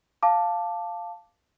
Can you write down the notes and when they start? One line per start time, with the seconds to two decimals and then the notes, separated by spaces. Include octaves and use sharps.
0.23 F5 A5 D6